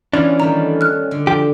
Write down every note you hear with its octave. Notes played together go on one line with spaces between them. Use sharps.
E3 B3 C#4 D4 F4
D#3 G3 A3 A#5
F6 F#6
D3
F3 G4